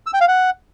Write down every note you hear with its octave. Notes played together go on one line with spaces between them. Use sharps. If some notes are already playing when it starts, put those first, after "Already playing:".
E6
G5
F5
F#5